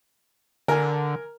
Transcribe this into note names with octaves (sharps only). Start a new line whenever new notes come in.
D3 A#4 G#5